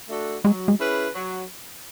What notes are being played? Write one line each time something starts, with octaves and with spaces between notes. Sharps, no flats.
A3 D4 F#4 A4
F#3 G#3
G#3
C#4 E4 G#4 B4
F#3